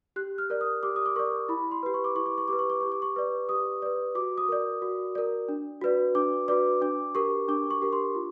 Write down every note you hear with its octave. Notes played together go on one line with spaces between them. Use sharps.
G4 F#6
F6
A#4 D5
D#6
G4 D6
D#6
D6
A#4 D5 C#6
E4 B5
C6
G4 B4
C#6
D6
E4 C#6
D6
C#6
G4 B4 D6
C#6
D6
G4 C#6
D6
C#6
B4 D5
G4 D#6
B4 D5
F#4 D6
D#6
A#4 D5
F#4
A#4 D5
D4
F#4 B4 D5
D4 D6
F#4 B4 D5 D6
D4 D6
G4 A#4 C#6
D4 D6
C#6
G4 A#4
C6
F4